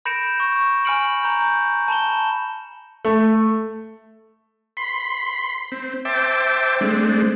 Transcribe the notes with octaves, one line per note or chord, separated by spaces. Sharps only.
B5 G6 A#6 C#7 D7 E7
C#6
G#5 B5 F6 C#7 D7 F#7
A#5 G6
A5 B5 E7 G7
A3
B5 C6
C4
C5 E5 G5 A5 D6
G#3 A3 C4 D4